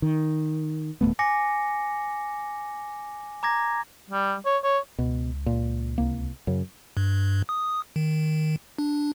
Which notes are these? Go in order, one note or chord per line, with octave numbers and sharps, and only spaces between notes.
D#3
D#1 A#1 A3 B3
G#5 D6 A#6 C#7
A#5 D6 G#6 A#6
G3
C#5
C#5
C#2 B2
A#2
C2 A#3
F#2 C#3
G2
D#6
D#3
D4